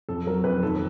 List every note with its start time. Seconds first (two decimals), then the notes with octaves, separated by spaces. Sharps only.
0.09 F2 A4
0.27 F#3 A#4
0.44 F2 B4
0.62 D#2 A4